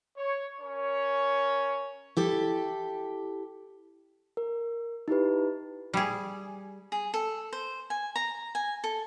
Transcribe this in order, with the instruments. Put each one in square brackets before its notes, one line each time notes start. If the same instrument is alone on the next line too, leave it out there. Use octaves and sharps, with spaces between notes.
[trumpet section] C#5
C#4 A#4 C#5
[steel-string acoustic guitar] E4 G4 A4
[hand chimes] A#4
D#4 E4 G4 B4
[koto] G3 G#4
[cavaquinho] G#4
A4
C5
G#5
A#5
G#5
A4